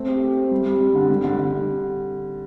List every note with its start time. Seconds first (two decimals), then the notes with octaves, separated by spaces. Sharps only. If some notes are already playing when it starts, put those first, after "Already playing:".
Already playing: A3 C4
0.08 G4
0.22 G4
0.37 C4
0.52 G3
0.66 G3
0.81 G3
0.95 D3
1.09 G3
1.24 D3
1.39 D3